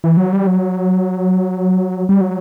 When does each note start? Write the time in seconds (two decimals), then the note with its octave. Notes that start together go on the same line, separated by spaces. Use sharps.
0.04 E3
0.17 F#3
0.32 G3
0.47 F#3
2.09 G3
2.21 F#3